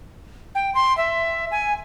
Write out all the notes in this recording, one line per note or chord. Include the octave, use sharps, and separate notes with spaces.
G5
C6
E5
G#5